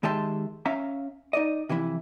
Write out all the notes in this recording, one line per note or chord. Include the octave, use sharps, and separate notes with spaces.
D#3 G#3 G4 E5 A5 C6
C#4 E5 F5 A#5
D#4 D5 D#5
C3 E3 F3 E4